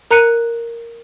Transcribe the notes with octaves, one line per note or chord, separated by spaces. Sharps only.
A#4 A#5 F#6 C#7 D#7